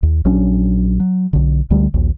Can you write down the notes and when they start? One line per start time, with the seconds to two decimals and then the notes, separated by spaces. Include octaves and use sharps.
0.03 D#2
0.25 A#1 F#3 C#4 D4
1.00 F#3
1.33 B1 D3
1.70 C#2 D3 G3 A3
1.94 A#1 D#2